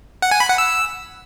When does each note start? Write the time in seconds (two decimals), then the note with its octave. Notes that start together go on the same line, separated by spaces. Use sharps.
0.22 F#5
0.31 G#5
0.40 B5
0.49 F#5
0.58 E6